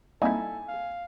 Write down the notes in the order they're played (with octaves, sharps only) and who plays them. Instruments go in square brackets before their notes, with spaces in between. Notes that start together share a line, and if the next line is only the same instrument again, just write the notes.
[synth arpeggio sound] G3 A#3 C4 [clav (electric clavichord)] D#4 E4 [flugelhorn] A4 [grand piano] G#5
[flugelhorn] F5